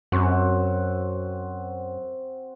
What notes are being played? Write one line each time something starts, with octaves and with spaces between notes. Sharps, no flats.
F#2 C4 F#4 F#5